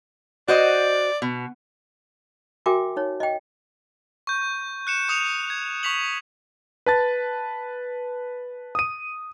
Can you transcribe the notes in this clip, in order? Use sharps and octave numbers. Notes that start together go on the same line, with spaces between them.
F#4 C5 D5 D#5
B2
F#4 A#4 E5 G5 G#5 D6
D#4 C#5
D#5 G5
C#6 G6
F#6 C#7 E7
C#6 D#6 C#7 F7
G#6
C#6 G6 B6 F7 F#7
B4 A5 A6
D#6 D#7